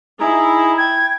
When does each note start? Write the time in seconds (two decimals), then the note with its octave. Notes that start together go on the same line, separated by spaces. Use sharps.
0.20 D#4 E4 G#4 A#5
0.78 G5 G#6